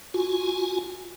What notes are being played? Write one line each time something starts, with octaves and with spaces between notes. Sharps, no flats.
F4 F#4 G#5